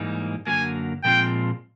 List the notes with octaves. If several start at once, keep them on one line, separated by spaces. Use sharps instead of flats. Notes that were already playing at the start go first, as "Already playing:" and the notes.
Already playing: G#2 E3 G3 A#3 D#4
F#2 D3 F#3 A#3 G#5
A#2 F3 G#3 C4 F4 G5